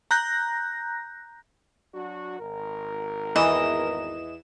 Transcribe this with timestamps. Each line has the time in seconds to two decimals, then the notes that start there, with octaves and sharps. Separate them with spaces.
0.11 A#5 F#6 G6 A#6
1.94 F#3 D4 F#4
2.39 G#1 A#4
3.36 E2 E3 D#5 E7